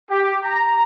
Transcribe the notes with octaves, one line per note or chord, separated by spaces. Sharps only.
G4
A#5